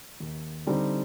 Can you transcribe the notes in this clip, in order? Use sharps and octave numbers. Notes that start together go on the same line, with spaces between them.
D#2
D3 G3 C4 D#4